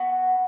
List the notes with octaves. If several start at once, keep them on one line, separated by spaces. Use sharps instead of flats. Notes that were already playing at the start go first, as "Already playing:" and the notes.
Already playing: B3 F#4